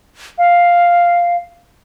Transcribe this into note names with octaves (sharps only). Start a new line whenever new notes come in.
F5